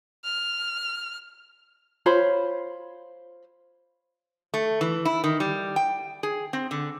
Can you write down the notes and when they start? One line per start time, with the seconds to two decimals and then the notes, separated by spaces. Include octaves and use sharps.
0.25 F6
2.06 F4 C5 C#5 B5
4.54 A3
4.81 E3
5.05 E4
5.24 D#3
5.40 G3
5.76 G5
6.23 G#4
6.53 C4
6.71 D3